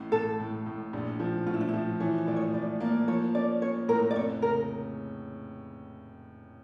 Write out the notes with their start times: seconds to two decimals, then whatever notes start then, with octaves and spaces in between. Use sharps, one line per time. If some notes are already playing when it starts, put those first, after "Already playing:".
Already playing: A1 A2
0.12 A2 A4
0.39 A2
0.66 A2
0.93 A#1
1.20 F3
1.47 A2 F4
1.54 E4
1.61 D4
1.68 E4
1.73 F3
2.00 E3 C#5
2.18 C#5
2.27 A2 D5
2.36 C#5
2.54 A2 D5
2.80 A#3 D5
3.08 F3 C#5
3.35 C#4 D5
3.62 C#4 C#5
3.88 A2 A#4
4.11 D5
4.16 F1 C#5
4.42 C#3 A#4